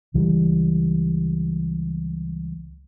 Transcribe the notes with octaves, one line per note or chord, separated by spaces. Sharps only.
C#2 E3 G3